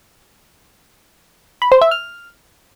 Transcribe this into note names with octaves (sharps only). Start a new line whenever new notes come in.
B5
C5
E5
F6